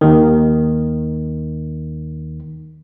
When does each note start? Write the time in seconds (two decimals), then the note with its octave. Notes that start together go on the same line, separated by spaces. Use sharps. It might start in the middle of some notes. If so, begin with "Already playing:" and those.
0.01 D#2 D#3